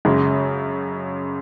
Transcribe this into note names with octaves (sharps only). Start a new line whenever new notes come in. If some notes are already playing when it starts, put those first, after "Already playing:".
F#2 C#3 G#3